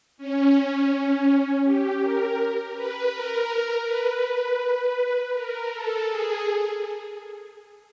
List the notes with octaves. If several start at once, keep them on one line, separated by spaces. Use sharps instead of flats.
C#4
G4
A#4
B4
A#4
B4
A#4
A4
G#4